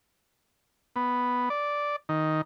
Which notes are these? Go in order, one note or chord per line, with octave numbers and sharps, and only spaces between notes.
B3
D5
D#3